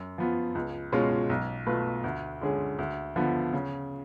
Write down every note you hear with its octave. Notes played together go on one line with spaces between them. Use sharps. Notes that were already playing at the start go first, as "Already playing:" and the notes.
Already playing: F#2
F3 B3 F4
C#2
B2 G#3 C#4 F4
B1
B2 A3 F4 B4
D2
D3 G#3 C#4 G#4
D2
D3 F3 B3
C#3